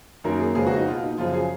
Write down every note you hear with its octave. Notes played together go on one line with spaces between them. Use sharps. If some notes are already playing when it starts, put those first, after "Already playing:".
F#2 D#3 A#3 A#4
G#4
F2 C#3 G#3 B3 G#4
F#4
D#4
B2 A#3 F4
D#4
F#2 C#3 F3 F4
G#4